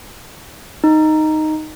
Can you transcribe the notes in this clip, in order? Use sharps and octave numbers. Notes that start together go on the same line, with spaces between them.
D#4